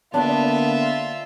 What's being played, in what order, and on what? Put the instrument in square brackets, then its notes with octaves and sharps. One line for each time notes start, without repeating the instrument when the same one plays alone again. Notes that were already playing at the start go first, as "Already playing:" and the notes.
[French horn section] D3 A#3 [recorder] B3 [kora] D4 [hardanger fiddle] F4 E5